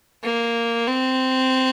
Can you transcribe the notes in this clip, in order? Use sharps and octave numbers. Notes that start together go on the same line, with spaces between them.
A#3
C4